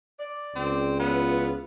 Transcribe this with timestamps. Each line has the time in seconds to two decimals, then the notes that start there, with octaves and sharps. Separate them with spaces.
0.19 D5
0.56 C#2 C4
1.00 E2 B3 C#4 F4